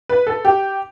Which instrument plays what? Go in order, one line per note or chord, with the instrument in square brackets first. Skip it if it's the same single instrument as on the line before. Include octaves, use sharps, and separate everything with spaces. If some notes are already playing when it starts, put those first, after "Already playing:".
[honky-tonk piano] B4
A4
G4